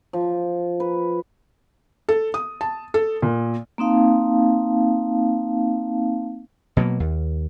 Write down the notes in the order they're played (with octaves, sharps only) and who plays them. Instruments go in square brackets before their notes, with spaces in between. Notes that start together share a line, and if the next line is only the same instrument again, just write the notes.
[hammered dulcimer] F3
B4
[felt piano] A4
D#6
A5
A4
A#2
[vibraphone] A#3 C4 D#4 F5 A5
[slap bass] B2 F#3 G3 A#3
D#2